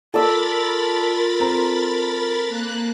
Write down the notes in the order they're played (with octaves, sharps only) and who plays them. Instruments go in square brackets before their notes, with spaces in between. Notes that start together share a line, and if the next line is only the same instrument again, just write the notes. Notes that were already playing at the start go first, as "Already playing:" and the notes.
[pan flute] F4 [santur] A4 D5 E6 [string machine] A#4 B5 A6
[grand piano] C4 A#5
[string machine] A#3 F#6